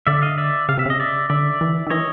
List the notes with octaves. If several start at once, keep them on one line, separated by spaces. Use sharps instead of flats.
D3 D5 E5
D#5 F5
D5 E5
C#3 F5
C3 E5
C#3 D#5
D5 E5
D3 D5 E5
E3
D#3
E3 C#5 D#5